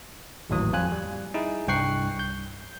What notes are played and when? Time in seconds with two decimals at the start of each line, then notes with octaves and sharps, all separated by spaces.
0.50 G#1 D#2 A2 E3 F#3 D#6
0.73 F2 G3 F4 G#5 F#6
0.92 G3
1.34 D#4 E4 G#4
1.68 C2 G2 G5 C#6 F#6 C7
2.19 G6